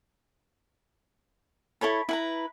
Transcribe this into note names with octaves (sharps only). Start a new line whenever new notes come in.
E4 A4 C#5 B5
E4 B4 A#5